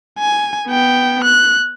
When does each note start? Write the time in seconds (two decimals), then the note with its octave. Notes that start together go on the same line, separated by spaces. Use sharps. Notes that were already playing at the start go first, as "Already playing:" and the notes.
0.19 G#5
0.67 B3 G5
1.24 F#6